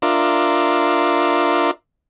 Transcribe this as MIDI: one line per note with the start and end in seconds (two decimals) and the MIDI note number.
0.02 1.71 62
0.02 1.71 65
0.02 1.71 70
0.02 1.71 76
0.02 1.71 84
0.02 1.71 86